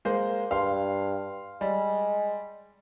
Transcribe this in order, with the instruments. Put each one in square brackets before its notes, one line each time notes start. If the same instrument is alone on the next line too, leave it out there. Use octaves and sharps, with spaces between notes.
[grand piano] G#3 C5 [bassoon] A#3
[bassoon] G2 [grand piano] F5 C6
[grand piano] G3 [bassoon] G#3